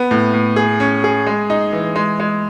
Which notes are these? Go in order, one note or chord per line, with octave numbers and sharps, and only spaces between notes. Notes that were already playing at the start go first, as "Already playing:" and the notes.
Already playing: B3
A2
A2
G#4
C#4
G#4
G#3
D#4
E3
G#3
G#3